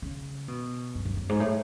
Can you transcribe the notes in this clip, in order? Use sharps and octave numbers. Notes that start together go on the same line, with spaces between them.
C#3
B2
F#2
F#2
F#2
G#2
A2